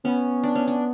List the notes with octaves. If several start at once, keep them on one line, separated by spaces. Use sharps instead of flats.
B3 C#4
D4
C#4
D4